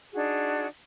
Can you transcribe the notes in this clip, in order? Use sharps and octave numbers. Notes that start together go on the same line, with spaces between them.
D4 D#4 F#4 G#4